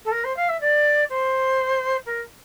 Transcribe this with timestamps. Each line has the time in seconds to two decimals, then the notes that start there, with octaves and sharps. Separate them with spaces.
0.05 A4
0.11 A#4
0.24 C5
0.36 F5
0.49 E5
0.60 D5
1.09 C5
2.06 A#4